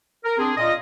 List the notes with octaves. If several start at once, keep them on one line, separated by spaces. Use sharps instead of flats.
A#4
C4 D4 G#4
A#2 F4 D#5